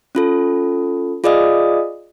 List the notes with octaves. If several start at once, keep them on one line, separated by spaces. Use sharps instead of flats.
C#4 F4 A4
F4 G#4 D5 D#5 F5 D#6